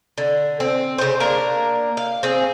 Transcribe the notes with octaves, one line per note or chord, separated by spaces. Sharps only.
D3
C4
C#3 C5
A#3 D4 A#4
F5
C4 G#4